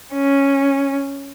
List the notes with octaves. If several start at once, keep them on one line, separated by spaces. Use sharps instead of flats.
C#4